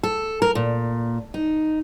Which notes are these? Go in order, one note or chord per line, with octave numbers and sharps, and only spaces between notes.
A4
A#4
A#2
D#4